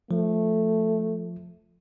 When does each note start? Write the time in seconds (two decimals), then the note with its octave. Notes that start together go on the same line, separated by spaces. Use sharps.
0.11 F3 A3